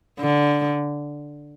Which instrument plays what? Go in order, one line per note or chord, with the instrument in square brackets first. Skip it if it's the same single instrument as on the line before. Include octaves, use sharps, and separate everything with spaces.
[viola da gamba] D3